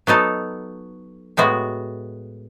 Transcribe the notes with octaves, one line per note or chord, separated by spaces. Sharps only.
F#3 B3 D#4 A4
A2 G#3 B3 F#4